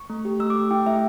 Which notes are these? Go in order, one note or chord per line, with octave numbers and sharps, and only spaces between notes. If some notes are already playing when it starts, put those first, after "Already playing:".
Already playing: C#6
A3
G4
A3 E6
D6
G4
E4 G5
A3 E5